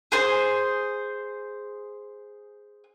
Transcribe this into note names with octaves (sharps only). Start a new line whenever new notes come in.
G#4 C5